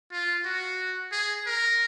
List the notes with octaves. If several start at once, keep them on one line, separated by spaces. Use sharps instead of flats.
F4
F#4
G#4
A#4